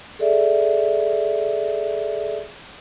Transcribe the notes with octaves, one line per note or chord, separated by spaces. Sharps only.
G#4 A4 D5 E5